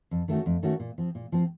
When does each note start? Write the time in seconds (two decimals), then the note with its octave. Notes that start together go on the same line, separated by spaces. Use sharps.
0.11 F2
0.28 D#3 A3 C#4 F#4
0.46 F2
0.63 D#3 A3 C#4 F#4
0.80 A#2
0.98 F3 C4
1.15 A#2
1.32 F3 C4